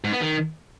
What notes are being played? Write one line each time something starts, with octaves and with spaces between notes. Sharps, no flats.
G#2
B3
D#3